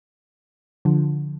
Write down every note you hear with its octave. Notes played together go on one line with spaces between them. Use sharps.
D3 F3